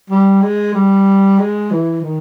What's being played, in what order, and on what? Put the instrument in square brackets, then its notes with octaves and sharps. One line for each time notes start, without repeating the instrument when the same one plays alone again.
[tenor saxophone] G3
G#3
G3
G#3
E3
D#3